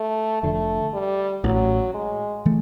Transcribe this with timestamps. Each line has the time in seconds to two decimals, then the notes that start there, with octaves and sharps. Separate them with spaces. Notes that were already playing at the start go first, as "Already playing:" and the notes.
Already playing: A3
0.43 F1 F2 D3 A3
0.94 G3
1.43 A1 A2 E3 F#3
1.94 G#3
2.45 E3 A3